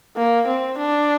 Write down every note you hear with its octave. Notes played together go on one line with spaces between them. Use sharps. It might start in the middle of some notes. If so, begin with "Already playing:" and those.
A#3
C4
D4